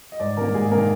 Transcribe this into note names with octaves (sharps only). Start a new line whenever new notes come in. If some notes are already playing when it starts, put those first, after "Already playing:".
D#5
G#2 D5
D#3 A#3 A#4
G#2 G#4
D#3 A#3 A#4